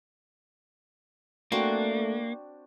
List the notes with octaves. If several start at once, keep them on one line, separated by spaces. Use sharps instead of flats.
A3 A#3 C4 D4 F#4